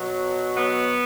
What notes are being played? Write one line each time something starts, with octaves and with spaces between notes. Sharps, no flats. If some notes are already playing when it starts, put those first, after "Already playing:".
Already playing: B2 F#3
B3